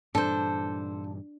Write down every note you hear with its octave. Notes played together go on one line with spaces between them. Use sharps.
G2 A#2 E3 D4 A4 C5